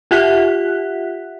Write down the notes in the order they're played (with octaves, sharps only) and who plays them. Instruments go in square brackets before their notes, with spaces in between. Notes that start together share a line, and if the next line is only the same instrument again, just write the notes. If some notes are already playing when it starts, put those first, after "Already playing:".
[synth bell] F4 G4 E5 F#5 F#6 B6